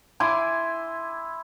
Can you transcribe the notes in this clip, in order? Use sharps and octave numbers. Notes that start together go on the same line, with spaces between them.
E4 G#5 C6 D6